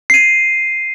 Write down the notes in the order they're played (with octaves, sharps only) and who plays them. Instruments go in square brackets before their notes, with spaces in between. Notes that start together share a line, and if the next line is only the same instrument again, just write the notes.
[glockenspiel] C7 D#7